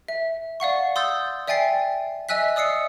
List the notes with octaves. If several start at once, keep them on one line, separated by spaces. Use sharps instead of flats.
E5
D5 F5 F#5 C#6
C6 D#6 E6 G6 A6
D5 E5 G5 G#5 A6 C7
D#5 E5 G#5 E6 F#6 B6
D5 D#6 E6 C7 C#7